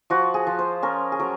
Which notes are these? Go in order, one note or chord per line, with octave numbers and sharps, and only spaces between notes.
F3 F#4
G#4
F3
C5
C#4 A#4
G#4
F#3 A#4